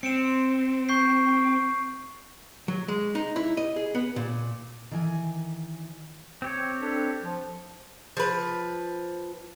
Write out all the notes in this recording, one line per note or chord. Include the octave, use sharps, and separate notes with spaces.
C4 C#7 D7 E7
C#6 G6 C7
F#3
G#3
D#4
E4
D#5
G#4
B3
A#2
D#3 E3 G#5
C4 G4 C#5
D4 A4 B4
F3
F3 B4